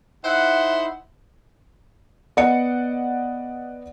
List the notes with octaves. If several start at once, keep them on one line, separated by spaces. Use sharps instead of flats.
D#4 E4 C5 E5 F#5
B3 D5 D#5 F#5 C#7